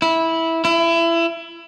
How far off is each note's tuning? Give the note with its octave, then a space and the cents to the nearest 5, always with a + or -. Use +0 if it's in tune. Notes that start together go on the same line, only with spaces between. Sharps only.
E4 -10
E4 +25